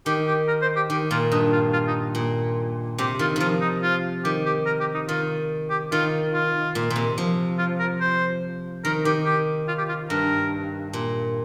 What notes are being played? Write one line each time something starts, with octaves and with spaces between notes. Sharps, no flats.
D#3 G4
G4
A#4
C5
G4
D#3 G4
A#2 F4
G2 D#4
F4
F4
D#4
A#2
C3 G4
D#3 F4
D#3 F3 F4
D#4
F4
D#3 G4
G4
A#4
G4
D#4
D#3 F4
G4
D#3 F4
F4
A#2
A#2
C3
F3
F4
A#4
C5
D#3 A#4
D#3 G4
G4
F4
G4
F4
G2 A#4
A#2